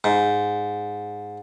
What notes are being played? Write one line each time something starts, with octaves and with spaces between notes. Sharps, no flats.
G#2